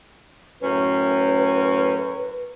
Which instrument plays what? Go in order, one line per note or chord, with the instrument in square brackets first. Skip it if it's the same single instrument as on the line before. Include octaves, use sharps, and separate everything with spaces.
[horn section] F#2 A2 C#4 [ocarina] B4